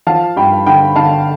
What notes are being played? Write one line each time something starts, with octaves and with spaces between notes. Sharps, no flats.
F3 F5 A5
G2 G5 B5
D3 G5 B5
D3 F5 A5